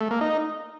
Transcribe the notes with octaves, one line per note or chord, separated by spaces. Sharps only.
A3
A#3
D#4